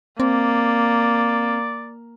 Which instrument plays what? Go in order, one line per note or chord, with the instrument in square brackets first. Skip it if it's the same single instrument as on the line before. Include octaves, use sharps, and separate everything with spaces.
[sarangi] A#3 [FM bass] C4 [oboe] D5